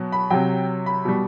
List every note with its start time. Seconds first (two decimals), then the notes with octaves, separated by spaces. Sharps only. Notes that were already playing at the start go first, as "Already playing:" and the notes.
Already playing: B2 F#3
0.12 B5
0.30 C3 F#3 G5
0.86 B5
1.05 B2 G3